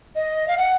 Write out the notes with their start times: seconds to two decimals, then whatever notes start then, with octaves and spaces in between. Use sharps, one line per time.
0.16 D#5
0.48 F5
0.58 F#5